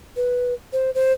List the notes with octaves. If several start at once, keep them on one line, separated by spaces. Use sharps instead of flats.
B4
C5
C5